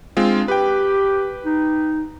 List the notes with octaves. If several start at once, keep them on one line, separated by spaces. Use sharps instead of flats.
G#3 C4 D4 F4
G4 B4 G5
D#4